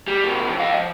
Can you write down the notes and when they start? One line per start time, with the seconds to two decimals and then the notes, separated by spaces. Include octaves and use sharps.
0.07 G3
0.24 B2 F3
0.48 F2
0.59 D#5 F5
0.74 F3